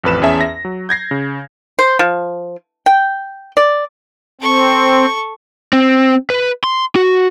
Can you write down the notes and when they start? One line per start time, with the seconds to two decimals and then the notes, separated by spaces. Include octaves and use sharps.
0.04 A1 F2 B4 E7
0.22 E2 C#4 G#4 E5 A5
0.41 A#6
0.65 F#3
0.89 G6 G#6 A#6 C7
1.11 C#3
1.79 C5
1.99 F3
2.86 G5
3.57 D5
4.41 C4 A4 C#6
5.73 C4
6.30 B4
6.64 C6
6.96 F#4